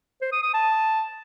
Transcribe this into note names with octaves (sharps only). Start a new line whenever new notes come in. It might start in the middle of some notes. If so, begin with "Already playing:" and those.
C5
D#6
D#6
A5